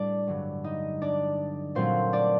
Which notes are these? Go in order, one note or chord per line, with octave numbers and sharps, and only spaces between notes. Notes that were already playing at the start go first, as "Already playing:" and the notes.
Already playing: A2 G3 D4 D5
G2 D3 F#3 A3
D#4 D#5
D4 D5
A#2 F#3 A3 C4 C5
D4 D5